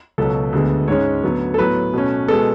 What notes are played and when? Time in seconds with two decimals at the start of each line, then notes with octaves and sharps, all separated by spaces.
0.18 C#2 B2 F#3 A4
0.52 D2 D3 G#3 B3
0.88 G#2 G#3 C#4 C#5
1.24 D2 D3 F#3 B3
1.54 A4
1.58 A2 F#3 B3 B4
1.93 B2 A3 C#4
2.28 B2 G#3 B3 A4